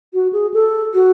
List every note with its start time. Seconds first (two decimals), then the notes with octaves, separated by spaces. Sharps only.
0.14 F#4
0.33 G#4
0.54 A4
0.94 F#4